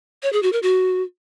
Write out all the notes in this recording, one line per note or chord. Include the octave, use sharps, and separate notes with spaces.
C#5
G#4
F#4
A#4
F#4